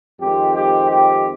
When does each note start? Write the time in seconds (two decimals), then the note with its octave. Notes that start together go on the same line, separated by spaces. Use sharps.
0.20 F2 D#3 G#3 C4 G4
0.54 G4
0.88 G4